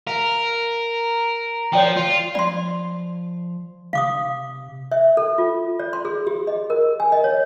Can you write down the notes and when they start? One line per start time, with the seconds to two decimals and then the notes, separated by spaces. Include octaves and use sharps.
0.07 A#4 F5
1.73 F3 C#5 D5 G5
1.96 F4
2.35 F3 D5 C6
3.93 C3 F5 D6 D#6
4.92 E5
5.17 A4
5.38 F4
5.79 D5
5.93 C6
6.05 G#4
6.27 G4
6.47 D#5
6.70 A#4
7.00 G#5
7.12 D#5
7.24 C#5